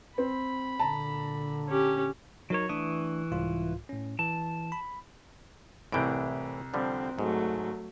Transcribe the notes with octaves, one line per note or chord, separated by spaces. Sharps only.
C4 B5
A#2 D3 A5 A#5
C#4 G4
F#3 D#4 A#4 C#5
E3 A3 D4 C#6 D#6
C2 G#2 F4
A2 C#4
E3 A5
B5
C2 A2 E3 G6 D7
D3 F3 G3 C4
G#2 F#3 A3